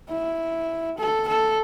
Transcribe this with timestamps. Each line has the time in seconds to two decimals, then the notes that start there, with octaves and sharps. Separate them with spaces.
0.09 E4
0.99 A4
1.28 A4